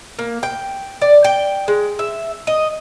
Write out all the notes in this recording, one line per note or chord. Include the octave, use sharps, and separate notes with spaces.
A#3
G5
D5
G5
G#3
E5
D#5